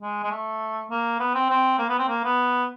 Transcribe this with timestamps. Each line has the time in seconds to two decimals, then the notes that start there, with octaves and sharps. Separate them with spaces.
0.02 G#3
0.23 G#3
0.31 A3
0.91 A#3
1.20 B3
1.34 C4
1.50 C4
1.79 A#3
1.89 B3
1.99 C4
2.09 A#3
2.24 B3